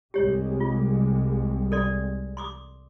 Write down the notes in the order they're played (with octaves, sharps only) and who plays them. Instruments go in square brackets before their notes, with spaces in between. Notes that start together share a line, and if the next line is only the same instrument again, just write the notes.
[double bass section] C2 G3 G#3 [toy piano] G4 C#5
[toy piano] F4
A4 D5 C6
C6 D6 D#6